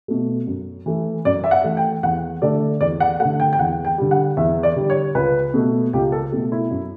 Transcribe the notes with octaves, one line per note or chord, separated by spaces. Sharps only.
B2 A3
F#2
E3 A3
F#2 D5
E5
F#5
E3 A3
G5
E2 F#5
D3 A3 D5
E2 D5
F#5
A3 F#5
D3
G5
G5
E2 F#5
G5
D3 G3
F#5
E2 E5
D5
D3 G3
C#5
C#2 B4
B2 A3
C#2 G4
A4
B2 A3
E4
F#2